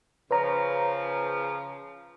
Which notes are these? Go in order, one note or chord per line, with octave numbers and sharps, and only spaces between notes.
C#3 F3 B4 C#5 A#5